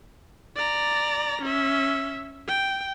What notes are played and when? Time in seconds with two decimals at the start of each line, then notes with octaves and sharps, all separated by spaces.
0.56 D5 A#5
1.42 C#4 E5
2.48 G5